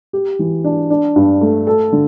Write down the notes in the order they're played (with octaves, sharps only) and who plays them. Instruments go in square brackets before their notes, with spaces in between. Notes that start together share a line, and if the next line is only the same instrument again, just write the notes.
[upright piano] G4
E3
D4
D4
G2
A3
A4
D3